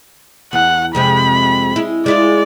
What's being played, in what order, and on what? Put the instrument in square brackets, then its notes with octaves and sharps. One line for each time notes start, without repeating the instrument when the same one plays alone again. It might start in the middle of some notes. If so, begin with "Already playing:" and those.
[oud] E2 [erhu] F#5
[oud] F2 C3 G#3 [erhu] B5
[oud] G#3 E4
[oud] G#3 E4 F4 [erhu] D5